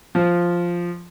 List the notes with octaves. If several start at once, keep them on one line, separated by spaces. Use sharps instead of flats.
F3